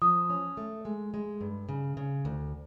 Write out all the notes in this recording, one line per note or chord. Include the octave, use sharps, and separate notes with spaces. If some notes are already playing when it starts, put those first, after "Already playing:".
F3 D#6
C#4
A3
G#3
G#3
G2
C#3
C#3
D2